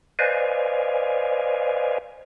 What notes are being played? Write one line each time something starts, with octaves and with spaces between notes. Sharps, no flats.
B4 C5 D5 D#5 F5 G#5